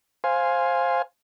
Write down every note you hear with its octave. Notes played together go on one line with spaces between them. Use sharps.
C5 F5 G#5